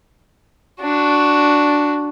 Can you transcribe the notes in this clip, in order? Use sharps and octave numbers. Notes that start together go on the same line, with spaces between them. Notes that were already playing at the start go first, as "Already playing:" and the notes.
D4 F#4